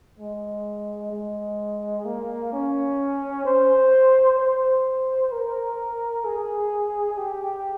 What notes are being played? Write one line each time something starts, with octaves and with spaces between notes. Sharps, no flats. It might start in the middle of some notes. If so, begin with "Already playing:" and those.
G#3
G#3
A#3
C#4
C5
C5
A#4
G#4
G4